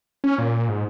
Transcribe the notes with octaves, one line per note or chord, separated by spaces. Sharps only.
C#4
A#2
G#2